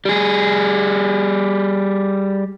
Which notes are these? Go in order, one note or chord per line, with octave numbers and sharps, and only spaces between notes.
G3 G#4